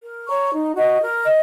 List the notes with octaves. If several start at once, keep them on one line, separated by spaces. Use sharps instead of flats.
A#4
C#5 A#5 C#6
D#4
F#4 D#5
A#4
D#5